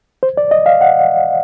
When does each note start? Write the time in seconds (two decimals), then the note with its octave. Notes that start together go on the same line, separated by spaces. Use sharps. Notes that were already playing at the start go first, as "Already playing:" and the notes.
0.23 C5
0.37 D5
0.51 D#5
0.66 F5
0.81 F#5